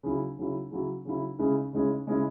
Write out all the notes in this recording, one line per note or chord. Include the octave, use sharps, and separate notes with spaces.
C#3 F#3 E4
C#3 F#3 E4
C#3 F#3 E4
C#3 F#3 E4
C#3 G#3 C#4 E4
C#3 G#3 C#4 E4
C#3 G#3 C#4 E4